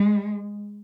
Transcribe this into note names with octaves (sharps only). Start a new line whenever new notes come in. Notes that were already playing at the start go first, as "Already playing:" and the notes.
Already playing: G#3